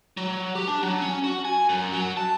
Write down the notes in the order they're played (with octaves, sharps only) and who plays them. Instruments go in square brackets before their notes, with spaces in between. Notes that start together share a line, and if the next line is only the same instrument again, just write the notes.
[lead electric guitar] F#3
G4
D4
F#3
C#4
F#4
G#5
F#2
F#3
A5